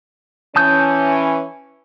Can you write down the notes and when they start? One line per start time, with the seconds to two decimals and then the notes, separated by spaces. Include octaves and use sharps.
0.56 E3 C#4 A5 D#6 G6